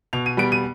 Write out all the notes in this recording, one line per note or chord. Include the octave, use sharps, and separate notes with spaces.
B2 F7
D#7
G3 B3 D7
D#7